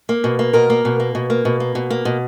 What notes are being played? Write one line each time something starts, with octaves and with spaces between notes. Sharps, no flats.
A#3
B2
A#3
B2 A#4
A#3
B2
A#3
B2
A#3
B2
A#3
B2
A#3
B2